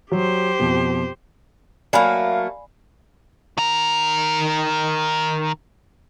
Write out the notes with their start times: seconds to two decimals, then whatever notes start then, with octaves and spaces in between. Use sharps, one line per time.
0.12 F#3 G4 C5
0.60 F2 B2
1.93 F#3 A3 A#3 D5 F5 G#5 B5
3.58 D#3 A#4